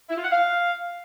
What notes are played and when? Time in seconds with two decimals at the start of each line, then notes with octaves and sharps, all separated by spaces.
0.09 E4
0.17 F4
0.24 F#5
0.31 F5